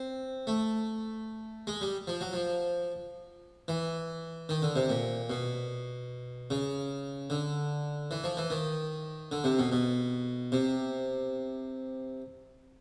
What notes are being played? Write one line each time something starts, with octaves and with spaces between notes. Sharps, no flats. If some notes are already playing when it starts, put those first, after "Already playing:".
Already playing: C4
A3
G#3
G3
F3
F#3
F3
E3
D#3
D3
C3
A#2
B2
C#3
D3
E3
F3
E3
D#3
D3
C3
B2
B2
C3